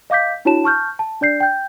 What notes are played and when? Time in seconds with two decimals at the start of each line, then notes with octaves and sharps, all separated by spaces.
0.10 D#5 F5 D6 G6 B6
0.45 D4 E4 F#4 C#5 A5 E7
0.64 A5 C#6 F6 G6
0.99 A5
1.21 D4 D5 G6 C7
1.40 G5 G6